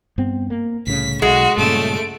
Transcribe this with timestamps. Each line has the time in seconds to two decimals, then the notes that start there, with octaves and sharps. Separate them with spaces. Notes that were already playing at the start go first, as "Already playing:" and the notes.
0.18 G2 B3 C4
0.50 A#3
0.87 C2 A2 C#3 B6
1.22 B1 G#3 F#4
1.57 G2 A#2 C#3 A3 D7